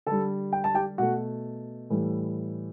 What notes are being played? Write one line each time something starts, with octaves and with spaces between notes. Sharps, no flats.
D3 G3 A4 A5
G5
A5
G4 G5
B2 A3 F#4 F#5
A2 E3 G3